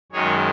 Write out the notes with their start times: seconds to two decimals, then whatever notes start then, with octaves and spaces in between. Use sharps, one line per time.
0.12 F#2 D#3 G#3 G#4 C#5